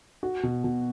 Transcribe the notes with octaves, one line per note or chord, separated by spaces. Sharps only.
F#4
B2
B2